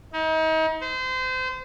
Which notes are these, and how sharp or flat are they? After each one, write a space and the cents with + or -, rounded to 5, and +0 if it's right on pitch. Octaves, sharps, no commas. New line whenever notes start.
D#4 +35
C5 -30